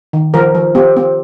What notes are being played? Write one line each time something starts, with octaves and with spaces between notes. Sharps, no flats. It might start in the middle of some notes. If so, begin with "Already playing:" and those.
D#3
F3 A#4
F3
C4 G4
C4